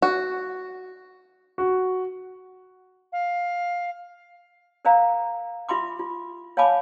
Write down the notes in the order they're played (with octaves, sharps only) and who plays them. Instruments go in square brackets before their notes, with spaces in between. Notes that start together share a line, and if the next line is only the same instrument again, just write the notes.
[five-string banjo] F#4
[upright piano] F#4
[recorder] F5
[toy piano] A#4 C5 D5 F5 A#5
F4 E5 B5 C6 D6
F4
C#5 F5 G#5 A5 B5 D6